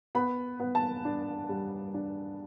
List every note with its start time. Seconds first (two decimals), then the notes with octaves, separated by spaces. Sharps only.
0.15 B3 B5
0.60 B3
0.75 A5
1.05 D4
1.49 G3
1.94 D4